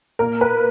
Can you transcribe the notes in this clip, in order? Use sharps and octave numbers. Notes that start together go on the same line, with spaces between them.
A#2 A#3 A#4
B4